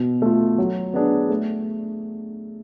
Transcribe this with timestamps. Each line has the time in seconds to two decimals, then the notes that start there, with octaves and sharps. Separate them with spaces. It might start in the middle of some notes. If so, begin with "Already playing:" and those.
Already playing: B2
0.22 A3 F4
0.58 F#3
0.94 B3 D4 G#4
1.30 A3